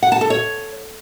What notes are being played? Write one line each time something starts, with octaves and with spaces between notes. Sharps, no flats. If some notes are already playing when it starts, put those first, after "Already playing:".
F#5
A5
A4
C#5